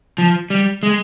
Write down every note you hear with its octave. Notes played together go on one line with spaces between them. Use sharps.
F3
G3
G#3